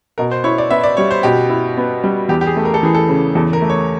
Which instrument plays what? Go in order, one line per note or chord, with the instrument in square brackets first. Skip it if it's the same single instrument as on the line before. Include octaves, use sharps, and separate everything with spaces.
[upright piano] B2 [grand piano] A#4
[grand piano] C5
[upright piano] E4 [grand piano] C#5
[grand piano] D5
[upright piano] B3 [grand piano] E5
[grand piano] D5
[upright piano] G3 [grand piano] C#5
[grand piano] C5
[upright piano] B2 [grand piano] G4
[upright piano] E4
B3
G3
[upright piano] E2 [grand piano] G4
[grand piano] G4
G#4
[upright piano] A3
[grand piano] A#4
A4
[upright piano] E3 [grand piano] G#4
[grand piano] A4
[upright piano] C#3
[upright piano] E2 [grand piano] A4
[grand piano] A#4
[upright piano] A3
[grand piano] C#5